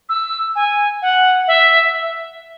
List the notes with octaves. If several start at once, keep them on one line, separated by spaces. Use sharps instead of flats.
E6
G#5
F#5
E5